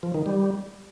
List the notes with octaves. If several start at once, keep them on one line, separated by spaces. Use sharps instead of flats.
F3
D#3
G3